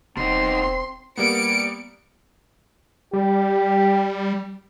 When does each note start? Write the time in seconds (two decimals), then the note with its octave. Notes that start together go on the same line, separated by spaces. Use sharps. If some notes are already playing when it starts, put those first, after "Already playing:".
0.17 E1 B2 C4 D#4 C6
1.17 G3 A#3 B3 C#7 D7
3.13 G3 G4